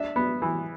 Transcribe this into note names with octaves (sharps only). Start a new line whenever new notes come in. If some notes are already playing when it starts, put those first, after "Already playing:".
Already playing: D4 E5
B3
E3